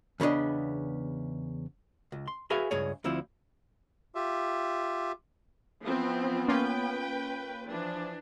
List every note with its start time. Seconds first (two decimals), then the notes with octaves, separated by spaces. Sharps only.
0.20 E2 C#3 B3 D4 D#5
2.12 C#2
2.28 C6
2.50 F#4 G#4 B4 E5 F5 G#5
2.71 C#2 G2 G#4 C#5
3.04 D2 F3 C4 E4
4.15 F4 G4 E5
5.84 E3 F3 B3 C4
6.48 A#3 C#4 F4 B4 G5
7.68 E3 F3 D4